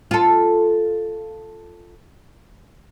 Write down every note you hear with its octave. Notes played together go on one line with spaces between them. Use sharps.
F4 A4